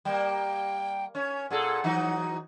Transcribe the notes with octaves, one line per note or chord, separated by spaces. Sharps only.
G3 A#3 G5
C#4 C#5
A#2 G#4 A4 F#5
E3 F#3 D#4